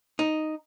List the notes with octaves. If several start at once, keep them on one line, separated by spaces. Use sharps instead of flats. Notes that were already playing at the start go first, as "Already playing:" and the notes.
D#4